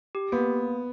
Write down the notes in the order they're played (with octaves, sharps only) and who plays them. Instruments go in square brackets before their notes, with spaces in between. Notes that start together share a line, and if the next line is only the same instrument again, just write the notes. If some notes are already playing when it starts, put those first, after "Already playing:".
[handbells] G4
[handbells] A#3 [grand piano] B3